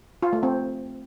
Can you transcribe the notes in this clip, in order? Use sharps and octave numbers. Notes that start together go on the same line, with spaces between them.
F4
A3
C4